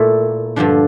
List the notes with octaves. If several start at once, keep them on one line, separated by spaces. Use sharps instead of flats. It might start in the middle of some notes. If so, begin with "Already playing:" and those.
Already playing: A#2 A3 E4
G2 D3 F3 D4